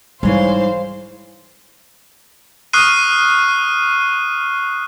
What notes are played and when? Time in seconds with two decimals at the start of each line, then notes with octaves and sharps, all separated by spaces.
0.23 G#2 E3 G3 C5 C#5 F5 C6
2.73 C#6 D#6 F6 F#6 C7 D#7